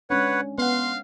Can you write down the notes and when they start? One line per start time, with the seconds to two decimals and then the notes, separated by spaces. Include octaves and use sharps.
0.10 G#3 C#4 D4 B4 C#5 F#5
0.58 B3 F5 F#5 C6